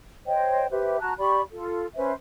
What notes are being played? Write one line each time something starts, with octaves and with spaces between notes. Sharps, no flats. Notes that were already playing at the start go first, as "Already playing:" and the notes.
C5 C#5 D#5 G5
G4 B4 C5 E5
F#4 A5 A#5 F#6
G4 D5 B5 C#6
F4 A4
C#4 B4 C5 E5